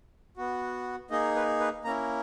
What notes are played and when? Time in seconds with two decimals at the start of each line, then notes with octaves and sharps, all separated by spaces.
0.37 B3 F#4
1.10 A#3 D#4 G#4 D#5
1.36 B4
1.60 B4
1.84 A#3 C#4 E4 A#5